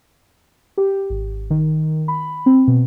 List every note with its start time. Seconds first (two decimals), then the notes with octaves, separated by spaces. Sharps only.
0.78 G4
1.10 G#1
1.50 D#3
2.08 B5
2.46 C4
2.68 B2